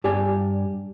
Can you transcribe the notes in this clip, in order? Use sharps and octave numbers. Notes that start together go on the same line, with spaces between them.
G2 G4 D5 G#5